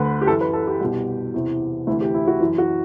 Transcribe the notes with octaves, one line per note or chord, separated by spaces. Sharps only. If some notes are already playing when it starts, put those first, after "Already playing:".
Already playing: D2 D3 B4
G4
F#2 E3 A4
B4
A4
G4
C2 B2
E2 C3 E3
D2 C3 E3 E4
G4
E4
F#4
F#2 E3 E4
F#4